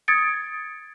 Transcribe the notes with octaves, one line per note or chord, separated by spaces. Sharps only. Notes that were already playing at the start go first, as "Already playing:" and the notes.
D#6 G#6 A6 C#7 D7